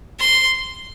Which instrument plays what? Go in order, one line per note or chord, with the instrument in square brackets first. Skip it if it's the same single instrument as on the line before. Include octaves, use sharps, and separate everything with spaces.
[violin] C6